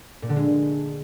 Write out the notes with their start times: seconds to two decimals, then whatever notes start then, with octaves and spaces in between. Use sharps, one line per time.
0.22 A#2
0.29 D3
0.36 G#3